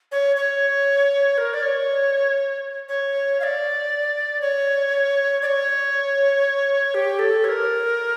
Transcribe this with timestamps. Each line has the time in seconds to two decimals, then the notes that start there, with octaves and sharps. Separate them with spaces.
0.12 C#5
0.36 C#5
1.38 A#4
1.54 D5
1.63 C#5
2.89 C#5
3.40 F5
3.43 D5
4.41 C#5
5.42 D5
5.46 C#5
6.94 G4
7.19 A4
7.44 C#5
7.49 A#4